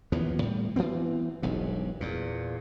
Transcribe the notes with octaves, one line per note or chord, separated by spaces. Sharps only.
D#2 E3 F3 B3
A2 G3
E3 F#3 B3 C4
E1 B1 G2
E2 A#2